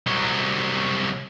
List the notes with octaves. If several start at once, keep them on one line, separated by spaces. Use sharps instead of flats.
C2 F#3